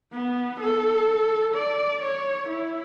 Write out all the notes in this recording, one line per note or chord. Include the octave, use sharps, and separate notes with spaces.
B3
A4
D5
C#5
E4